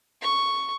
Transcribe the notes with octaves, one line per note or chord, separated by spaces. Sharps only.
C#6